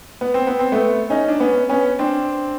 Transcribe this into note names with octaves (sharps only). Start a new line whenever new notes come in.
B3
C4
B3
C4
A3 B3
C#4 D#4
D4
B3 C#4
B3 C#4
C4 D4